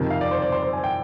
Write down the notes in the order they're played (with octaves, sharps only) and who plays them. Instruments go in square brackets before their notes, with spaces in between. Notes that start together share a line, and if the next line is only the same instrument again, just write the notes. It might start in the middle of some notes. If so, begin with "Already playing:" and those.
Already playing: [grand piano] F2 C3 D#3
F5
D5
C5
D5
C5
C5
G#5
G5